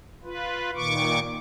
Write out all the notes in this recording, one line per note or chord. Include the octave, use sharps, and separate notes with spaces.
F4 B4
A#2 D#3 C#6 D6